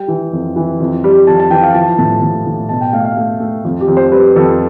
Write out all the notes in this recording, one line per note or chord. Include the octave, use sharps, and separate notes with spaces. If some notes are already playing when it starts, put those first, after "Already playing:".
Already playing: G3 G5
E3
F2
E3
F2
G3
F2 A5
A5
E3 G5
F5
F3 A5
A2 A5
A2
A2
B2 A5
G5
A3 F5
F5
A3
A3
F2
G4
F2
C5
G3 B4
F2 A4